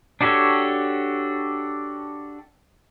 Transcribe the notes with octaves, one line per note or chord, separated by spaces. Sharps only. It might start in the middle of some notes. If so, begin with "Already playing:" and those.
D4 F#4 G4 A4 C#5